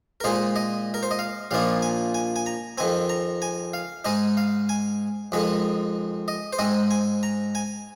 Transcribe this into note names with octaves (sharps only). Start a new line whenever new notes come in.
A#4
A#2 G#3 D#4 C5
D#5
A#4
C5
D#5
F5
A#1 A#2 F3 A#3 D#4 F5
G#5
G#5
G#5
A#5
F2 D#3 C4 G#5
A#5
G#5
F5
G#2 G#3 D#4 D#5
F5
G#5
F2 D#3 G#3 D#4
D#5
C5
G#2 G#3 C4 D#5
G#5
A#5
G#5